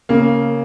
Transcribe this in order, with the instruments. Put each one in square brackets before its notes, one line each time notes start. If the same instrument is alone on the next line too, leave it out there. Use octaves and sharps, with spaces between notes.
[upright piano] C#3 [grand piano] A#3